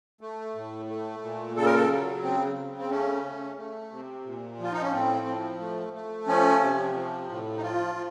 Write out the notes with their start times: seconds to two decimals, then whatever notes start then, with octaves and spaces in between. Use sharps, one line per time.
0.21 A3
0.55 A2
0.89 A3
1.22 A#2
1.56 C#3 A4
1.66 A#4
1.75 A4
1.90 F#3
2.23 C#3 C4
2.57 C#3
2.79 C4
2.91 A3 C#4
3.25 A3
3.58 A3
3.91 C3
4.25 A#2
4.59 F3 F4
4.72 D#4
4.82 C#4
4.92 A2 C4
5.26 F3
5.60 A3
5.93 A3
6.27 F3 C#4
6.61 C3
6.95 F3
7.29 A2
7.57 D#4
7.62 F3 F4
7.95 F3